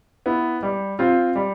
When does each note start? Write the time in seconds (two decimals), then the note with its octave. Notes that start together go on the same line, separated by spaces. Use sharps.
0.26 B3 E4
0.63 G3
0.99 C4 F4
1.36 G3